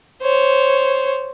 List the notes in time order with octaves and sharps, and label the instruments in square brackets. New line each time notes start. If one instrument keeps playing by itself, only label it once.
[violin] C5 C#5